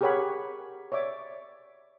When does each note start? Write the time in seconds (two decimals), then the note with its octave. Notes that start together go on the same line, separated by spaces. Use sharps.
0.01 G4 G#4 A#4 C#5 F#5 B5
0.92 C#5 D5 E5 D6